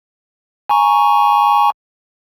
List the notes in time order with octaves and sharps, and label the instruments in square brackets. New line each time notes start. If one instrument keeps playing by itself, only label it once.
[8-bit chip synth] G#5 A#5 C#6